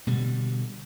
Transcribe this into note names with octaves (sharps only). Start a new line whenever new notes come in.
B2 D3 G3